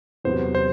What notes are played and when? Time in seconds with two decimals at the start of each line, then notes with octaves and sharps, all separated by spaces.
0.24 E2 C3 F#3 B3 C5
0.55 C5